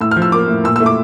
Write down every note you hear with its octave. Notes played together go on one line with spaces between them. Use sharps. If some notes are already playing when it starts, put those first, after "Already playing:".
A2 E6
F6
F3
E6
A#3 D6
A2
A#2 E6
E6
A3
D6